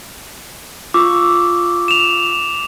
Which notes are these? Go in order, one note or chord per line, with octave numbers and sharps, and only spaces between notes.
F4 C#6 D6 E6
E7 F7